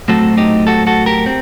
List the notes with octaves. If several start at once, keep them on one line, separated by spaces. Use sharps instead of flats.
A2 F#3 A3 C4 F#4 A4
D#4 G4
F#4 A4
F#4 A4
G4 A#4
C4